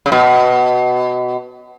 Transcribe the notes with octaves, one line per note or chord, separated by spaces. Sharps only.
C#3
B2